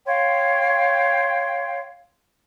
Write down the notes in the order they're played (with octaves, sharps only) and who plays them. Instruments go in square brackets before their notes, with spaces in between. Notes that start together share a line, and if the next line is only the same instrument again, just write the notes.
[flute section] C#5 F5 G5 C6